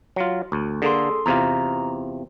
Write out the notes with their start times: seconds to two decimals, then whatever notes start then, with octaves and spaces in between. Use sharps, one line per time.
0.16 F#3 F4
0.52 D2
0.82 D3 A#3 G#4 A4 C6
1.26 E2 C3 F4 A#5